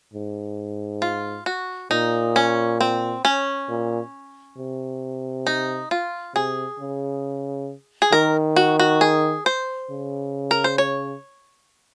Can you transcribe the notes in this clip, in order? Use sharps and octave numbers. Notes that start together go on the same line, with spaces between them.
G#2
F4
F#4
A#2 D#4
C#4
C4
C#4
A#2
C3
D#4
F4
C3 G#4
C#3
G#4
D#3 A#4
F#4
F#4
G#4
C5
C#3
A#4
C5
C#5